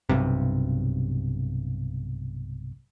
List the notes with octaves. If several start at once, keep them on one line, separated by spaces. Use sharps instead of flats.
B1 G2 C3